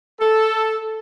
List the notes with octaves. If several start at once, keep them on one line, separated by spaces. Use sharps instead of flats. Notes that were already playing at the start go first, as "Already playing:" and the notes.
A4